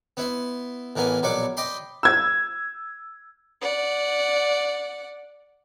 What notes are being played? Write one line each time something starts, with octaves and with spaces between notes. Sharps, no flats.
B3 E4 C6
A1 E3 A#3 B3 G#5
A#1 B2 F#3 D5 C#6 D6
D5 D#5 G5 B5 C6
E6 G#6
D5 F#5